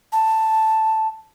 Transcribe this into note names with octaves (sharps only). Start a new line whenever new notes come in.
A5